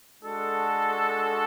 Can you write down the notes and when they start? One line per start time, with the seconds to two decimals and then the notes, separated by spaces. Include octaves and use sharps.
0.22 G#3 D4 F#4 A4